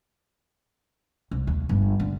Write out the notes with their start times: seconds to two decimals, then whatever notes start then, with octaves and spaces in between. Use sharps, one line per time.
1.31 C2
1.47 D#2
1.69 G1
2.00 D3